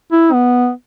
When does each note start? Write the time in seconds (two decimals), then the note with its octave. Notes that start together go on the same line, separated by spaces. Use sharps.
0.12 E4
0.33 B3